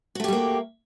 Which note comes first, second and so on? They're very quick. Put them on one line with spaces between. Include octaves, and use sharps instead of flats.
F#4 A3 G4 G3 A#3